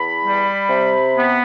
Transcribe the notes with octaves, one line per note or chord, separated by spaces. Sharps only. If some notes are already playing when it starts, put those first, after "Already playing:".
Already playing: E2 B5
G3
C3
B3